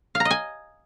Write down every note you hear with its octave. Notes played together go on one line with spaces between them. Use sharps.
F5
A#5
D#5
G#5